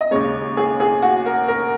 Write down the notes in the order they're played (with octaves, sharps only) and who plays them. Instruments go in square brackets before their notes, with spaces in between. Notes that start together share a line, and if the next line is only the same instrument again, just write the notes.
[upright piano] D#5
D#2 C#3 G#3 C#5
G#4
G#4
F#4
A#4
A#4